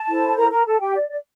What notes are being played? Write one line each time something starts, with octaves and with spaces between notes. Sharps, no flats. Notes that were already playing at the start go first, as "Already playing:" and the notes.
Already playing: A5
E4 A4 C5
A#4 A#5
A#4 A#5
A4 A5
G4 G5
D5
D5